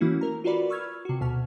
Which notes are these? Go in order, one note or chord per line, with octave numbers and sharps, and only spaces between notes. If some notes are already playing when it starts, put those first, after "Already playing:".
E3 A3 A#3 C#4 E4 F#4
A#4 A#5
F4 F#4 A#4 B4 D5 B5
B5 C#6 E6 F6 G#6
C3 F#4
D2 B2 A5 F6